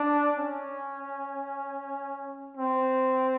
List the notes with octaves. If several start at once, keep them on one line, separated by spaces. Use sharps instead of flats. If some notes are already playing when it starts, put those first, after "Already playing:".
Already playing: D4
C#4
C4